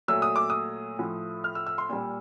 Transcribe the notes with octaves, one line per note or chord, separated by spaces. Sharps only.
A#2 F#3 A3 E6
D#6
D6
D#6
A2 F3 A3
F6
E6
E6
C6
A#2 G3